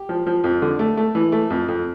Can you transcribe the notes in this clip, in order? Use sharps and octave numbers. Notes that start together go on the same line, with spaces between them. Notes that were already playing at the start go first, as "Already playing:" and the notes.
Already playing: G4
F3
F3
F2
D3
A3
A3
E3
A3
F2
F2